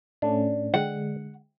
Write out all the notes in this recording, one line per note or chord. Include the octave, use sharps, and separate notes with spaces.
A2 A3 C#4 D4
D3 G#3 F#5